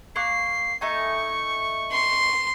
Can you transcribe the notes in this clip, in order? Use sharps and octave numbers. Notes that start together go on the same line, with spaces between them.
A#3 C#6 F#6 C7
A3 D#4 G#5 C#6
C6